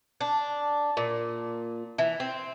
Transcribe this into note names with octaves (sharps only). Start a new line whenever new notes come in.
D4
A#2
E3
C4